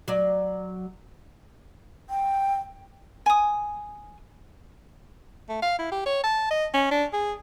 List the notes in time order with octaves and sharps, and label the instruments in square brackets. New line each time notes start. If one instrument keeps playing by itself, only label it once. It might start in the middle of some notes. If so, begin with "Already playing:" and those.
[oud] F#3 D5
[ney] G5
[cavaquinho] G#5 D#6
[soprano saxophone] A3
F5
E4
G4
C#5
A5
D#5
C#4
D4
G#4